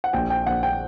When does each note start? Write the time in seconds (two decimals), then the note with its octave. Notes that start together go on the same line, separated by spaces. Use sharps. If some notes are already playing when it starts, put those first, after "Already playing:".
0.04 F#5
0.13 A#1 G5
0.30 G5
0.46 A#1 F#5
0.63 G5